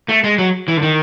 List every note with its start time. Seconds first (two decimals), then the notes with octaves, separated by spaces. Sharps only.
0.09 A3
0.24 G#3
0.38 F#3
0.68 E3
0.77 D3
0.83 D#3